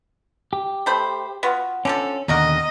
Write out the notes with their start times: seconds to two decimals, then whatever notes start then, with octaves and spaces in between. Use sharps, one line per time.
0.53 G4
0.86 A3 C5 B5
1.43 B3 F4 F#4
1.85 D3 F3 C#4 A4
2.28 D#2 B2 D3 A#3 F#4 A#4 D#5